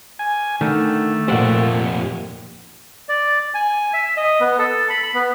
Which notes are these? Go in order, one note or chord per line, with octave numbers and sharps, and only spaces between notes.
G#5
D3 D#3 A3
F2 A#2 G4 C5 F#5
D5
G#5
E5
D#5
B3
A4
B5
B5
B3